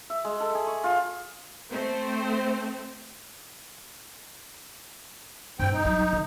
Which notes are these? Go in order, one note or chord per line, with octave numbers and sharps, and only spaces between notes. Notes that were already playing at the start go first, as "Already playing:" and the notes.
E5
G#3
A4
G#4
C#6
F4
A3 C4 C5
G2 C4 G5
D#4
F#3 G3
D3